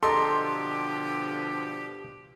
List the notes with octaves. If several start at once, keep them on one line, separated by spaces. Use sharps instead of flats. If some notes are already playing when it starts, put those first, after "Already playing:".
B2 D3 F3 G4 A4 D#5 A#5 C6